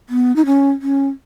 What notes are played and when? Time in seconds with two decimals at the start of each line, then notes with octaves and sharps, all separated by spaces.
0.09 B3
0.36 D#4
0.46 C#4
0.82 C#4